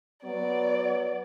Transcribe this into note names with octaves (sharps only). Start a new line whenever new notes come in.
F#3 B3 D5